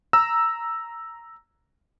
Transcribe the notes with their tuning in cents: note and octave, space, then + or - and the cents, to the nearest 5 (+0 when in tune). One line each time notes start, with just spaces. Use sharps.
A#5 +0 E6 +0